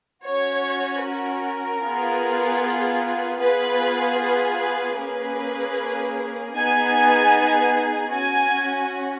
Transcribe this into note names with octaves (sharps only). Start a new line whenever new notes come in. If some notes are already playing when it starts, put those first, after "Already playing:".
C#4 F#4 C#5
A#4
B3 F4 G#4
B3 F4 G#4 B4
B4
B4
A#3 C#4 G#4 B4
B3 D#4 G#4 G#5
C#4 F#4 G#5